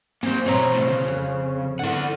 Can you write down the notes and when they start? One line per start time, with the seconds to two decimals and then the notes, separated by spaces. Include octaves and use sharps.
0.23 A#3 C4 G4 C5
0.46 F2 B2 C4 C#5 A#5
0.73 A2 C#3
0.88 C#3
1.08 F2
1.79 D3 B3 E4 F#5